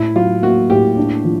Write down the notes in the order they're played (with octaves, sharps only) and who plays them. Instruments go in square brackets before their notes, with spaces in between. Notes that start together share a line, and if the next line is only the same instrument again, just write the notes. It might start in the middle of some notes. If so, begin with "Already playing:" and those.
Already playing: [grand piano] A2 [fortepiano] E4
[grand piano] F#3 [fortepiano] F4
[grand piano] A#3 [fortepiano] F#4
[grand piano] A2 [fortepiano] G4
[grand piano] D4
F3